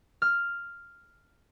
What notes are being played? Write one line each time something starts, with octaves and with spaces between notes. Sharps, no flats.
F6